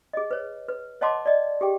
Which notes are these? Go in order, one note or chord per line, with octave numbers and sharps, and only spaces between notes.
G#4 D#5
B4 C#5
B4
C#5 D#5 F#5 A5 C6 D6
D5 D#5
G4 G#4 G5